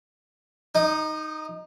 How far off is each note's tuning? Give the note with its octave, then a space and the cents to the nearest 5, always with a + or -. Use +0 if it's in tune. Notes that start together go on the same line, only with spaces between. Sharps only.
D#4 +0 D#6 -40